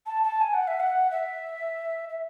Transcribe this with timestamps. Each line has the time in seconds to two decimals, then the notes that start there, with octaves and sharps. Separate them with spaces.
0.06 A5
0.23 A5
0.41 G#5
0.54 F#5
0.68 E5
0.80 F#5
1.11 E5
2.09 E5